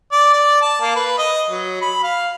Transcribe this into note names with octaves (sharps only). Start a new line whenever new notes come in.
D5
D5
A5
A#3
B4
D#5
F#3
B5
F5